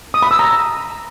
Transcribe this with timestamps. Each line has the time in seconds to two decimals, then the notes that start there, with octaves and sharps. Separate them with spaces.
0.14 D#6
0.22 B5
0.31 E6
0.39 A#5